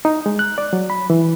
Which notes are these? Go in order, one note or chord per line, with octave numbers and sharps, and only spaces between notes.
D#4
G#3
F#6
D5
F#3
B5
E3